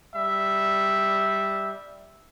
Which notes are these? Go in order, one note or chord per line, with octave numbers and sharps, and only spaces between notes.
G3 E5